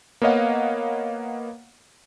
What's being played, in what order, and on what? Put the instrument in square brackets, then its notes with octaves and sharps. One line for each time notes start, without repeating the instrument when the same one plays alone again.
[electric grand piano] A#3 B3 C#5 D#5 F5 F#5